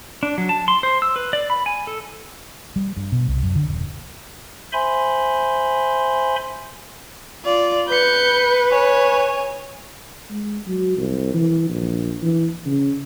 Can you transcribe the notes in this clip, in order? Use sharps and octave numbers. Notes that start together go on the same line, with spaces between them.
D4
F#3
A5
C6
C5
E6
B4
D5
B5
G#5
A4
G3
G2
B2
C2
F#2
D3
D#1
C5 E5 G#5 B5 C6
F4 D5
B4 G6 C#7
C#5 G#5
G#3
F#3
C2
E3
A#1
E3
C#3